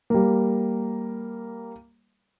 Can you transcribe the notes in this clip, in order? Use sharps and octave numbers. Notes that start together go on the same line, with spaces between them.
G3 A#3